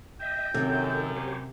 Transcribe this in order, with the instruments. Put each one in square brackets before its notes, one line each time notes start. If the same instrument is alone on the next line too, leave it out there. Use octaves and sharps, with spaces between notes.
[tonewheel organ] D#5 E5 [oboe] G5
[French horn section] F#2 [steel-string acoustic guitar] C3 [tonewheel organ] D#3 A4
[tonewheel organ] G4 C5 C#5